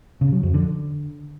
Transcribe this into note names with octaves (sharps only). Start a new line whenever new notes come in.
C#3
F#3
F2
D3